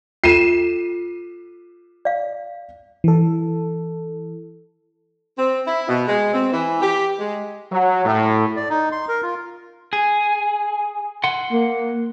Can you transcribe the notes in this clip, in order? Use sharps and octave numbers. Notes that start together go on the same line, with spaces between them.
F4 A4 C7 D#7 E7
D5 F5
E3 A4
C4
E4
B2
G#3
C4
E3
G4
G#3
F#3
A2
D5
D#4
C6
A#4
F4
G#4
F#5 C6
A#3